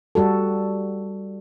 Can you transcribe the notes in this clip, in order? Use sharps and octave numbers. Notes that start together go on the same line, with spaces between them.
G3 F#4 A4